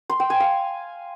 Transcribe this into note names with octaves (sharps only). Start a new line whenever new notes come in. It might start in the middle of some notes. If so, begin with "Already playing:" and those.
C6
G5
G#5
F5